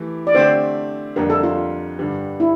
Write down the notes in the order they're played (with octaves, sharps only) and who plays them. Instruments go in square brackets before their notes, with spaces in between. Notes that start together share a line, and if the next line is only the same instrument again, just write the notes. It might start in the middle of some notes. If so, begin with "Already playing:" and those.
Already playing: [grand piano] E3 A3 E4 G4
[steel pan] D5
[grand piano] D3 A3 C4 G4 [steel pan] C5
[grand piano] F2 D3 G3 A#3 D4 [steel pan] A#4
[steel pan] A4
F4
[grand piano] G2 D3 G3
[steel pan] E4